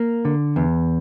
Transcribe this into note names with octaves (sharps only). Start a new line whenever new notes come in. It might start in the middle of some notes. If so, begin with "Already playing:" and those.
Already playing: A#3
D3
E2